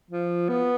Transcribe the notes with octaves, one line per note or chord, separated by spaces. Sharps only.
F3
B3